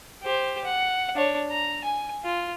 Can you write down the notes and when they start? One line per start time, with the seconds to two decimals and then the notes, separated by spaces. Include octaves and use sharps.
0.22 G4 C5
0.65 F#5
1.15 D4 C#5
1.50 A#5
1.84 G#5
2.24 F4